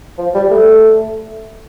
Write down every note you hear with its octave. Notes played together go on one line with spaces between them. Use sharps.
F3
G3
A3